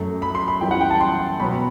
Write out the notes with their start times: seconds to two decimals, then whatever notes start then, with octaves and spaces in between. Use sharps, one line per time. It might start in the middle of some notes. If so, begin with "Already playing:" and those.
Already playing: F#2 F#3 A3
0.22 B5
0.35 C6
0.48 B5
0.61 F#2 E3 G3 G5
0.71 F#5
0.81 G5
0.91 A5
1.01 C6
1.40 B2 F#3 B3 B5